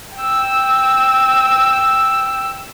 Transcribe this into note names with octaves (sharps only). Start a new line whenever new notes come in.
G5 E6